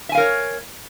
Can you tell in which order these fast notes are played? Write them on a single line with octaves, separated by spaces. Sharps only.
E5 G#5 F5 A#4 C#5